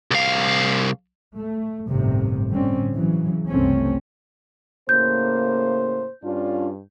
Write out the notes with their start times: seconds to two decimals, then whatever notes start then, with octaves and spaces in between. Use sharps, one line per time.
0.11 C2 F5
1.36 A3
1.88 G1 D2 A2 C3 D#3
2.51 A2 D3 G3 C4 C#4
2.94 C#3 E3 F#3
3.48 F#1 C2 A3 C4 C#4
4.89 A2 C#3 A#3 C5 G6
6.24 G2 C#4 D4 F4